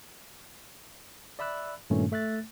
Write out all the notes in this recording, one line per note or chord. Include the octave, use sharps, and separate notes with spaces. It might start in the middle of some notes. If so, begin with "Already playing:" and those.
D5 E5 B5 E6 F#6
G2 A#2 D#3 A3 C#4
A3 E5 F#6 A6